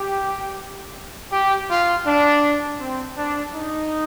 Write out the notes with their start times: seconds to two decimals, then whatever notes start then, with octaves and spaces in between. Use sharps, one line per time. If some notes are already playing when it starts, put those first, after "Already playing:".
Already playing: G4
1.31 G4
1.69 F4
2.06 D4
2.79 C4
3.16 D4
3.53 D#4